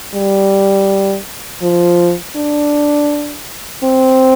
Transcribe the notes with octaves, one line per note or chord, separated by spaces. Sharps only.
G3
F3
D4
C4